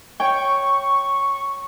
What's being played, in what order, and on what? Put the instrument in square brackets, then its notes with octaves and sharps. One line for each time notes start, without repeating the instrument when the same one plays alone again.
[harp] C#5 G5 [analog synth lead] C#6